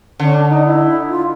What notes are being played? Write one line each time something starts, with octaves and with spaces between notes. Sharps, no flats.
D3 C#4
D4
D#4
E4
F4